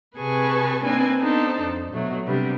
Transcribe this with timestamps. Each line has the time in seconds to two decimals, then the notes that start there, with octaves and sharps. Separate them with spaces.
0.18 C3 G#4 B4 G#5 A5 C#6
0.84 A#3 C4 D4 D#4 B4 G#5
1.18 B3 D4 D#4 A4 C5
1.62 F2
1.92 B2 F#3 A3
2.27 C3 G3 B3 D4